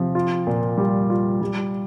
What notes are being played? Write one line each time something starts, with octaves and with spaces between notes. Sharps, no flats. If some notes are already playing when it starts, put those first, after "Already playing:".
Already playing: C3 F3
F4
A#2
G3
F4
G3